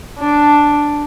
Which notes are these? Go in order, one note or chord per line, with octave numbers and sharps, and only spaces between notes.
D4